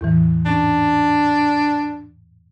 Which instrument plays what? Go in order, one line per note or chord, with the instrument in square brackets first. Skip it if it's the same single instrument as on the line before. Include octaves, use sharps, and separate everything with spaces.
[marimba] E2 A2 E3
[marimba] G#2 C#4 [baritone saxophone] D4